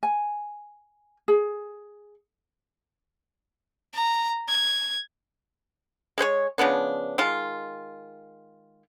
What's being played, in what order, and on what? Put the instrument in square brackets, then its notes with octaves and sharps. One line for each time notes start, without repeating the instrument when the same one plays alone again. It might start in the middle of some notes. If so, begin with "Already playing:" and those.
[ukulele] G#5
G#4
[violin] A#5
G#6
[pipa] G#3 G#4 C5 C#5
C#3 F3 B3 D4
D#3 G#3 F4